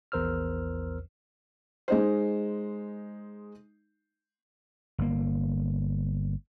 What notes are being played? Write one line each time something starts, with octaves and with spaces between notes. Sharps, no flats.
A#1 E2 A#4 C5 E6 F6
G#3 D#4 C5
G1 A#3